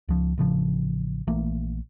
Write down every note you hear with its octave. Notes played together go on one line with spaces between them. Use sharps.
C#2 F3
A1 C#3 F3
A#1 E3 A3 A#3